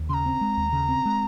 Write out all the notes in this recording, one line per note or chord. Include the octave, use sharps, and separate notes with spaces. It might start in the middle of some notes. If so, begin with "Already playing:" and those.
Already playing: D#2
C#3 A#5 C6
C4
G#3
D#2
C#3
C4
G#3